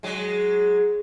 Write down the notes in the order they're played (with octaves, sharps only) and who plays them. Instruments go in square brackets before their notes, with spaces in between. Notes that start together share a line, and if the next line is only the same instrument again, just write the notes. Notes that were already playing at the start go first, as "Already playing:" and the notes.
[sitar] F#3 G#3